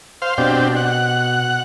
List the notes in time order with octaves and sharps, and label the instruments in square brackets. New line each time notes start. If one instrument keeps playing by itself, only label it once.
[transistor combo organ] C5 F5
[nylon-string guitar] B2 [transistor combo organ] C4 D4 G4
[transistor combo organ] F#5